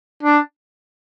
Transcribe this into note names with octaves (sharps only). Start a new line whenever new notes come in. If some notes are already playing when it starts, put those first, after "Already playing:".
D4